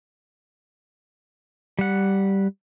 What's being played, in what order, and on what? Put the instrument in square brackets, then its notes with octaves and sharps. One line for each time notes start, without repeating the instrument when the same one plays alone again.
[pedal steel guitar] G3 F#5